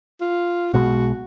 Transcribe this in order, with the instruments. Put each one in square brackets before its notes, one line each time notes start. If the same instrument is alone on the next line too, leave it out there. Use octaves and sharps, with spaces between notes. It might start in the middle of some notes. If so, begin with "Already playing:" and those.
[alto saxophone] F4
[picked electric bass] B1 B2 G#3 [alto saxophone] F#4